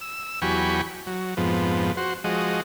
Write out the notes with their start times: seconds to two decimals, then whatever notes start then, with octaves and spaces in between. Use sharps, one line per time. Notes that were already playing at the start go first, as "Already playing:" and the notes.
0.01 E6
0.42 E2 F#3 G4 G#5 B5 C#6
1.07 F#3
1.37 F2 G#2 F3 B3
1.97 F#4 C5
2.24 F3 G#3 F#4 D#5